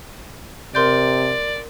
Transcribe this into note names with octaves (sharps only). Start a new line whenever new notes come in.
C3 A#4 D5 C6 G6